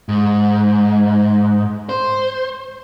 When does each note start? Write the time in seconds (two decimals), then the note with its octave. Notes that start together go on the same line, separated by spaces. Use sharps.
0.09 G#2
1.89 C5